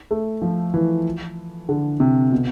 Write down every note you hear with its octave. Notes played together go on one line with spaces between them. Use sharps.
A3
F3
E3
D3
C3
B2